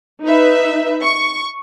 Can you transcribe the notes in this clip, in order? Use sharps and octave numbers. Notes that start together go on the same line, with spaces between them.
D#4 B4 E5
C#6